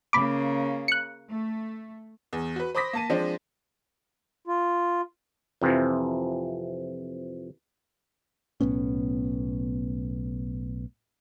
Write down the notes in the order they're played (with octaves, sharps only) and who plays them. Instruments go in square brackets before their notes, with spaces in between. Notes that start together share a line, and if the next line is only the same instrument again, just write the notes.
[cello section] C#3 A#3 [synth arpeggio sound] B5 D6
[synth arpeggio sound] F#6 C#7
[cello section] A3
[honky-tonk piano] E2
F#4 B4
C5 B5 D6 D#6 A#6 B6
A#3 A5 D#7
F3 G#3 C4 D4
[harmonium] F4
[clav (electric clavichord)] F2 C3 E3 F3
[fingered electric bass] B1 A2 B3 C#4